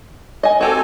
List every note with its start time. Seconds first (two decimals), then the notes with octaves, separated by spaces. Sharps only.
0.43 D#5 G#5
0.61 C4 F#4 G4 A4 G#5